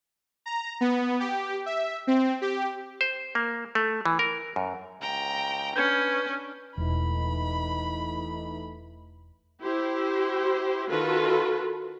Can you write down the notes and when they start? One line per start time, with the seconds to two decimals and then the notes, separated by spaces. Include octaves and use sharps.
0.46 A#5
0.81 B3
1.20 G4
1.66 E5
2.07 C4
2.41 G4
3.01 C5
3.35 A#3
3.75 A3
4.06 E3
4.19 A#4
4.56 F#2
5.01 C#2 G5 A#5
5.76 C#4 D4 B4 G6 G#6 C#7
6.78 E1 E3 A3 D#4 B5
9.61 E4 G4 C5
10.87 D#3 F4 F#4 A4 B4